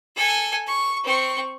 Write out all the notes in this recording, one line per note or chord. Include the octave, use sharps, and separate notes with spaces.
A4 G#5
C#6
C4 C#6